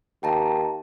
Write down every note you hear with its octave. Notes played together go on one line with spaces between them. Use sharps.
D#2 G5 A5 A#5